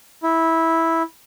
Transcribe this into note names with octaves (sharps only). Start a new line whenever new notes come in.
E4